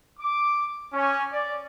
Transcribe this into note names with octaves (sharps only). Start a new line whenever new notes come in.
D6
C#4
D5